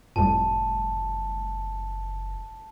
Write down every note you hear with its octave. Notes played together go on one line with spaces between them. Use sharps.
F#1 F2 A2 G3 A5